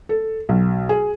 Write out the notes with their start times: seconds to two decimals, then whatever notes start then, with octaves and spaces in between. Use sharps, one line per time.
0.09 A4
0.49 B1
0.89 G#4